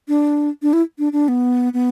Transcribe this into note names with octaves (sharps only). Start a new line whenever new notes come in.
D4
D4
E4
D4
D4
B3
B3